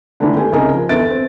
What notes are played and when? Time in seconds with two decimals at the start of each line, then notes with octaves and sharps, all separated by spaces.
0.20 D3 D#3 G#3 A3 D4 E4
0.35 G1 G4 G#5
0.53 C2 C#3 D#4 G#4 A#4 G#5
0.73 F3
0.89 G1 E2 E5 A6 D7
1.10 C4